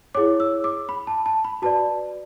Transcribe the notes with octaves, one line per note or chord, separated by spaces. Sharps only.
E4 G#4 C#5 D6
E6
D6
B5
A5
A5
B5
F#4 B4 D5 A5